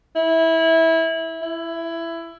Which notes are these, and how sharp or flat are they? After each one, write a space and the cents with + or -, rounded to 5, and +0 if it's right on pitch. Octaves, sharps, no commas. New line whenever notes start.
E4 -20
E4 +15